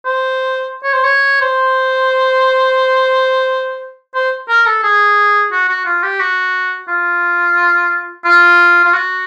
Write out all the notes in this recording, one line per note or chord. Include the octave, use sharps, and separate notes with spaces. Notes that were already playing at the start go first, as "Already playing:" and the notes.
C5
C#5
C5
C#5
C5
C5
A#4
A4
G#4
F#4
F#4
F4
G4
F#4
F4
F4
F4
F#4